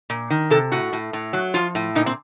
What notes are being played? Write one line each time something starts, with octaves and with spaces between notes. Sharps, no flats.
A#2
D#3
C3 A4
A2 F#4
A2
A2
F#3
F3 F4
A2
A#2 D#4
C4